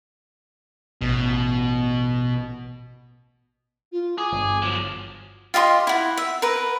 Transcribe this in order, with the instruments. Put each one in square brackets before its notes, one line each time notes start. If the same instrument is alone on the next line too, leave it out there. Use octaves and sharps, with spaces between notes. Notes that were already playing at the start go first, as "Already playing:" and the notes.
[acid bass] A1 [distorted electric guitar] B2
[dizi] F4
[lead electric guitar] G#4 [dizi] D6
[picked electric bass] G1
[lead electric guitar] F3 F#3
[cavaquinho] F4 G4 D#5 C6
E4 F#5
E5
A#4 B4